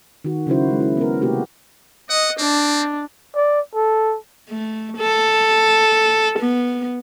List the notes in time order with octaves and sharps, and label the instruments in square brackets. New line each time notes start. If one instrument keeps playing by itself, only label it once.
[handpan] D#3 F#4
C#3 F#3 E4 F#4 C5
C#3 G#3
E4
B3 A#4
C3 A3 A#3 F#4 G4 A#4
[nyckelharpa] D#5 [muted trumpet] F#5
[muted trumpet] C4 [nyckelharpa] D4
[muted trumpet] D5
A4
[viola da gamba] A3
A4
B3